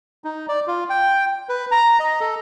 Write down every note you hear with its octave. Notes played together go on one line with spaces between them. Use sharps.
D#4
D5
F4
G5
B4
A#5
D#5
A4